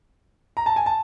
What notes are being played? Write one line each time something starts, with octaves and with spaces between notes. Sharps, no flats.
A#5
A5
G#5
A5